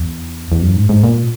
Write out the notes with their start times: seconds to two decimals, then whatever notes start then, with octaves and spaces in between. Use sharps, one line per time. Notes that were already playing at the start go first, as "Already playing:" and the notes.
Already playing: E2
0.52 E2
0.62 F#2
0.76 G#2
0.89 G#2
1.04 A#2